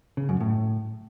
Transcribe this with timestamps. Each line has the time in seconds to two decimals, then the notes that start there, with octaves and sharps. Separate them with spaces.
0.17 C#3
0.29 F#2
0.41 A2